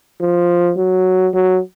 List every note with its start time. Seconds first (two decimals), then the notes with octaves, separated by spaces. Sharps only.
0.21 F3
0.77 F#3
1.34 F#3